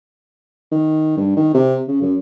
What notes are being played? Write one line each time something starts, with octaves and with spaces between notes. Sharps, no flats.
D#3
G2
D#3
C3
C#3
F#2